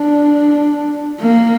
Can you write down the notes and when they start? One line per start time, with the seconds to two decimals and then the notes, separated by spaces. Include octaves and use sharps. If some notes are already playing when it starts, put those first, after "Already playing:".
Already playing: D4
1.21 A#3